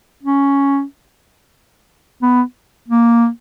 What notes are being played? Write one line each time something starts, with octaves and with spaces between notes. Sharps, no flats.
C#4
B3
A#3